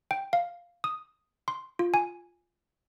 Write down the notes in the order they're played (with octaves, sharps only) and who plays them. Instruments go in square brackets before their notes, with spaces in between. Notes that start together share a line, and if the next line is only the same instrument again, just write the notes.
[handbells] G5
F5
D#6
C6
F4
G#5